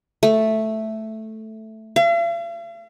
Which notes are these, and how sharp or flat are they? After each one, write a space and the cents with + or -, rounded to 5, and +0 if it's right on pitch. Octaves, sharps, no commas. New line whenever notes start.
A3 +0
F5 -45